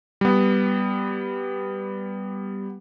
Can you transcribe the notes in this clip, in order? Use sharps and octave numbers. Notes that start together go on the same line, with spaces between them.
G3 B3